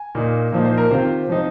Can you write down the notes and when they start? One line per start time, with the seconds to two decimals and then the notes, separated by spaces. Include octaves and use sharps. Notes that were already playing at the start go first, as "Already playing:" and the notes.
Already playing: G#5
0.15 A#2 A#3 D#4
0.52 A#2 F3 A#3 D#4
0.65 C5
0.77 A#4
0.91 C3 D#3 C4 F4 C5
1.29 F3 C4 D#4